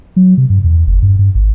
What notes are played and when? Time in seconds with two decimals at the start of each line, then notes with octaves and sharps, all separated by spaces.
0.16 F#3
0.38 C3
0.50 G2
0.64 E2
0.87 F#1
1.02 G2
1.19 G2
1.35 G#1